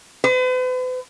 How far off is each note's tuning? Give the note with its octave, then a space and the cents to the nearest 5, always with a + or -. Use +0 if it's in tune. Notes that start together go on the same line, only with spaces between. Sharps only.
B4 +45